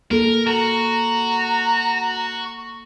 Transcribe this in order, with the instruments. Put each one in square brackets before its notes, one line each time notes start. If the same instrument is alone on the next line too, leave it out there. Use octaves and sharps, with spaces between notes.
[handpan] A#3 A4 [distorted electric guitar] A#4
[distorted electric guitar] F#4 [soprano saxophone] A#5